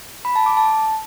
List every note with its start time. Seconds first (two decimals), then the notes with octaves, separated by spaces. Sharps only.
0.25 B5
0.35 A5
0.46 D6
0.57 A5